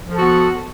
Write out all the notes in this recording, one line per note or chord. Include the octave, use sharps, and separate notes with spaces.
F3 B3 F#4 A4